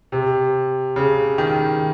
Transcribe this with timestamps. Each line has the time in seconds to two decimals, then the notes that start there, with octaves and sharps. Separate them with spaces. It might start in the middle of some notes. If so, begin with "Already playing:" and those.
0.12 C3
0.96 C#3
1.38 D#3